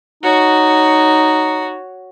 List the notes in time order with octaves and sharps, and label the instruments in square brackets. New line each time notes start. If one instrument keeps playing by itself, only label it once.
[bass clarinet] D#4 [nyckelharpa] F#4 C#5